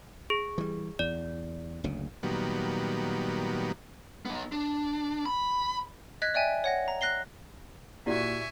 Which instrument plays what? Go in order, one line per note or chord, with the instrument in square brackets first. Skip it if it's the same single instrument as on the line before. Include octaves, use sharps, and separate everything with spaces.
[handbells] G#4
[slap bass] E3 G3
[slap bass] E2 [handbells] D5
[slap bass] F#1 D2 C#3
[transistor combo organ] A#2 D#3 F#3 G3 B3
[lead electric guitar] B3 D#4
D4
B5
[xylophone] D#5 F#6 G#6 B6
D5 E5 G5 G#5
C#5 F#5 A#6
A#5
F#6 A#6 C7 G7
[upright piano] A#2 F#4 [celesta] E4 G4 D5 [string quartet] E5 G#5 C#6